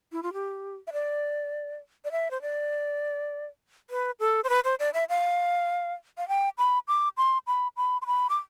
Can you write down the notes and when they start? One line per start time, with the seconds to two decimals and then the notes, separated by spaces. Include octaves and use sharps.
0.12 E4
0.23 F4
0.33 G4
0.87 E5
0.93 D5
2.05 D5
2.11 E5
2.31 C5
2.42 D5
3.90 B4
4.20 A4
4.44 C5
4.49 B4
4.64 C5
4.79 D5
4.94 E5
5.09 F5
6.18 F5
6.28 G5
6.58 B5
6.88 D6
7.17 C6
7.47 B5
7.77 B5
8.02 C6
8.06 B5
8.29 D6